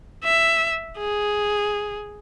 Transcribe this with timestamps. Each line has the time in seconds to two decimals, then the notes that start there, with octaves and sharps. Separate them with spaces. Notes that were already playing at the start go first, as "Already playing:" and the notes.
0.24 E5
0.98 G#4